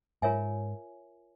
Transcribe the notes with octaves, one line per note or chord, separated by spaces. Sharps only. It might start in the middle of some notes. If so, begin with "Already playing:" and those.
G#2 F4 A#4 C#5 E5 G#5